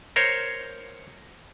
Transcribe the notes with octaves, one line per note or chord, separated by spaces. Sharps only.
A#4 C5 C#5